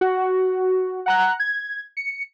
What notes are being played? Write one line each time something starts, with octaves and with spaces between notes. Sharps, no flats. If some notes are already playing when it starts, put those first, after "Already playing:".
F#4
F#5 A#5 F#6
G#6
C#7